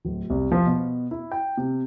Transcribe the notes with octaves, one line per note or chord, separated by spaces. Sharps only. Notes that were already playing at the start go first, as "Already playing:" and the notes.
D1
C2
F3
B2
E4
G5
C3